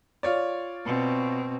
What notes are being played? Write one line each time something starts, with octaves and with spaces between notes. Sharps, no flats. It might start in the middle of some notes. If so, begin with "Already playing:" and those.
F4 C#5 D5
B2 C4